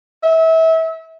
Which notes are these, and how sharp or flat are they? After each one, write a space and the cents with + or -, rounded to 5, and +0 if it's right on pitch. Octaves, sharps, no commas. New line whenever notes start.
E5 -30